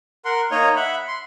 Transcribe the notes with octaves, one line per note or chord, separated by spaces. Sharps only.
A#4 F#5 C6
A#3 D#4 C#5 D#5 A#5
E5 F#5 B5
C6